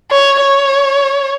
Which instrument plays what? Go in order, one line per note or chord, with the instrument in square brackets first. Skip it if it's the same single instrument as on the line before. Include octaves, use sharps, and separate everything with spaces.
[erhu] C#5
C#5